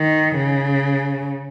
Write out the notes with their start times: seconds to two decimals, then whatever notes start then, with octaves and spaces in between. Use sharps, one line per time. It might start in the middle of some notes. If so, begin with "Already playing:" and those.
Already playing: D#3
0.36 C#3